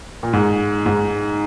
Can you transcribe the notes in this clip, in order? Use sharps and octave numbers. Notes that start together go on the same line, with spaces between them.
A#2
G#2
G#2